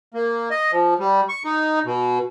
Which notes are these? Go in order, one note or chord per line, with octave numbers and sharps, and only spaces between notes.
A#3
D#5
F3
G3
C#6
D#4
B2